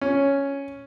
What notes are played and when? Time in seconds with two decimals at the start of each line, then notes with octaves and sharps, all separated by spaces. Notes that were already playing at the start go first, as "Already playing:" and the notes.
0.01 C#4